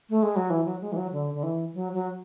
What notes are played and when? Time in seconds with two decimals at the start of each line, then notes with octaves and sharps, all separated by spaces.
0.10 A3
0.23 G#3
0.36 F#3
0.50 E3
0.65 F#3
0.81 G#3
0.92 E3
0.97 F#3
1.12 D3
1.34 D3
1.43 E3
1.74 F#3
1.94 F#3